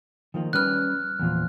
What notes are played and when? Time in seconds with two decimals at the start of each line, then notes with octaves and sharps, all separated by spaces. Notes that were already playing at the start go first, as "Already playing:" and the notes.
0.34 D#3 F3 A#3
0.53 G3 C#4 B4 F6 F#6
1.19 E2 A#2 F3